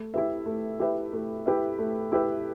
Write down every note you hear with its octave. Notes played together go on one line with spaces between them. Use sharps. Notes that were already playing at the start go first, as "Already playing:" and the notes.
Already playing: A3
E4 G4 B4 E5
A3
E4 G4 B4 E5
A3
E4 G4 B4 E5
A3
E4 G4 B4 E5